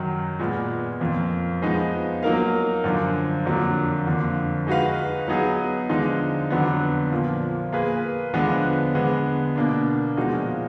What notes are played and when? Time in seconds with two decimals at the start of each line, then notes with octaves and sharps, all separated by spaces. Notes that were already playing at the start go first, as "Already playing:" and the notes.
Already playing: F#2 D#3 F#3
0.39 A#2 G#3 B3
1.01 F2 F3 A#3
1.62 F3 G#3 B3 D#4
2.23 F#3 A#3 D#4 A#4 F5
2.84 F#2 D3 F3
3.45 F2 D3 F#3 A#3
4.06 F2 D3 F3 A#3
4.67 G#3 D#4 F#4 B4 F5
5.28 F#3 B3 D#4 G#4
5.89 D3 F3 G#3 D#4
6.50 F2 D3 F#3 B3
7.11 A#2 F3 A#3
7.72 A#3 F4 G#4 B4
8.34 D3 F3 G#3 B3
8.95 D3 G#3 B3
9.56 B2 A#3 D4
10.17 A#2 F3 G#3 D#4 F#4